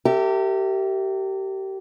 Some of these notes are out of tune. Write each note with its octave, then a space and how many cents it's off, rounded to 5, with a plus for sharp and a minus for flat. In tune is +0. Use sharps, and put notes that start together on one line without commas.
G4 -25 A#4 -45 E5 +0